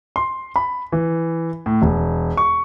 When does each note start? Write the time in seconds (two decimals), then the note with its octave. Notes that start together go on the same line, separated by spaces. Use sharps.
0.16 C6
0.56 B5
0.92 E3
1.66 A2
1.82 E1
2.37 C#6